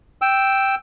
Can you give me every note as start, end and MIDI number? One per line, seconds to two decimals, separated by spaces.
0.22 0.75 79
0.22 0.75 88